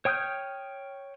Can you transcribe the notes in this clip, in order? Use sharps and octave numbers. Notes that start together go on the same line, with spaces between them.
C#5 G5 D#6 F6 G6